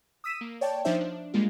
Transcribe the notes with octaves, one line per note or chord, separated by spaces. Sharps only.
D#6 E6 B6 D#7 E7
A#3
C#5 D5 G5 A5
F3 D4 D#4 C5 E5
D4
G3 G#3 A#3 F4